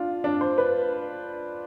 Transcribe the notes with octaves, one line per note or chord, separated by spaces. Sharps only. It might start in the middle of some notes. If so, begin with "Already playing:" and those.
Already playing: D4 F4
D4
C5
B4